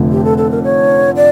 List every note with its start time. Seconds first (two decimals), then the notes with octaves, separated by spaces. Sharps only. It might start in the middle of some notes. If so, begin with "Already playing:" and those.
Already playing: F1 F2 D3 A3
0.12 G4
0.25 A4
0.38 A4
0.51 A#4
0.64 C#5
1.16 D5